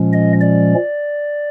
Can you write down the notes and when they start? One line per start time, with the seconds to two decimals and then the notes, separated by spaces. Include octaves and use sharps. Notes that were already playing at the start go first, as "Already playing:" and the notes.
Already playing: A#2 F3 G#3 C#4
0.13 D#5
0.41 D5